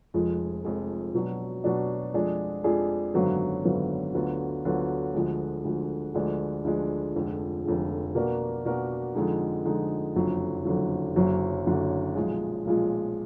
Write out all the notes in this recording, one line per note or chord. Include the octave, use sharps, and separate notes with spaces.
F1 F2 F3 G#3
F1 F2 F3 G#3
B2 F#3 D4
B2 F#3 D4
F2 F3 G#3 D4 G#4
F2 F3 G#3 D4 G#4
G#1 F#2 D3 F#3 B3
G#1 F#2 D3 F#3 B3
D2 D3 F#3 B3 F4
D2 D3 F#3 B3 F4
D2 D3 F3 G#3
D2 D3 F3 G#3
D2 D3 F3 G#3 D4
D2 D3 F3 G#3 D4
F1 F2 D3 F3 G#3
F1 F2 D3 F3 G#3
B2 A#3 D4 F#4 A#4
B2 A#3 D4 F#4 A#4
F2 D3 F3 G#3 D#4
F2 D3 F3 G#3 D#4
F#1 F2 D3 F#3
F#1 F2 D3 F#3
F#1 F#2 D3 F#3
F#1 F#2 D3 F#3
B1 A#2 F3 G#3
B1 A#2 F3 G#3